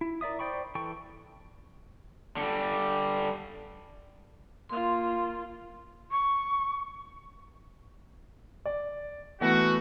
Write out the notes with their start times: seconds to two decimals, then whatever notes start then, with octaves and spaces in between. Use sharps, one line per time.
0.01 E4
0.21 A#4 D5 E5 D#6
0.39 C5 D5 G5 B5 C#6
0.75 E3 A4 G5 C#6
2.37 D3 G3
4.69 A#3 F4 F5 C6
6.11 C#6
8.66 D5
9.41 E3 A3 B3 F#4